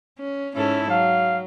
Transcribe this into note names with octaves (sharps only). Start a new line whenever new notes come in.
C#4
G#2 C#4 E4 A4
F#3 F5